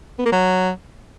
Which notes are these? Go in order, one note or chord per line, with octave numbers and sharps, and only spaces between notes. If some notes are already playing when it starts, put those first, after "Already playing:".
B3
A#3
F#3